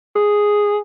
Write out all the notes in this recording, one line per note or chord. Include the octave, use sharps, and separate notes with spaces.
G#4